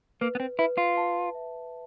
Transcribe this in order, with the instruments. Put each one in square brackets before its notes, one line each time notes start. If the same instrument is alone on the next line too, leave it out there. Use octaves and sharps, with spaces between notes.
[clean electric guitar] A#3 [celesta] B4
[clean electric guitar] B3
C4
[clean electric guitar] E4 [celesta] B4
[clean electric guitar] F4
[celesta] A5
E5